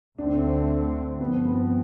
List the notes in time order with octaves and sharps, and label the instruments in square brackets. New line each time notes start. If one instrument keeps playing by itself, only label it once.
[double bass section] D2 D3 A3 C4 [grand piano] D4
[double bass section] G2 F3 C4 [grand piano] B3
[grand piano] B3